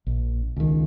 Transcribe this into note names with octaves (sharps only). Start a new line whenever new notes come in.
A#1
C#2 D#3